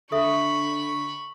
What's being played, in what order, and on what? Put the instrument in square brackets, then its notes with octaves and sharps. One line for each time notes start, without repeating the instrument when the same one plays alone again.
[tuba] D3 [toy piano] A4 E5 [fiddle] B5 C#6